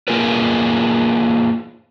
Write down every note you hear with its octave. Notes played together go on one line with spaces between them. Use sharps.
A#3 F4 G#4 A#4 B4